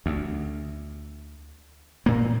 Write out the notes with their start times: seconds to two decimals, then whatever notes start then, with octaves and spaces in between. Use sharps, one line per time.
0.06 D2
2.06 A#2 A#3